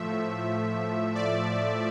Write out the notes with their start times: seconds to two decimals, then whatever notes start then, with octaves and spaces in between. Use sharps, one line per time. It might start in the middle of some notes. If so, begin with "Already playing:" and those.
Already playing: A2 F3 A3 E5
1.15 D5